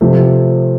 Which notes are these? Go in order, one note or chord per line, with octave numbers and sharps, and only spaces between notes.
C3 F3 A3